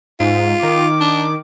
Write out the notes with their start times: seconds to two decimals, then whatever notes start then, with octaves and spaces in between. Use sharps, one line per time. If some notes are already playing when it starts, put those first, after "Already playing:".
0.20 G#2 F4
0.63 D#3 D6
1.00 D4